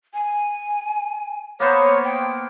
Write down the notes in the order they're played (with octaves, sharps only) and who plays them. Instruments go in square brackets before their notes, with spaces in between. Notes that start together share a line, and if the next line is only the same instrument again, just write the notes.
[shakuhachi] G#5
[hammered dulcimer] A#3 B3 C5 [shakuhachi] C#5
[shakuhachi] G5